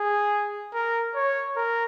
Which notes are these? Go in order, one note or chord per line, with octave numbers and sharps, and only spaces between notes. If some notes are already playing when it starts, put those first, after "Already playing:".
Already playing: G#4
A#4
C#5
A#4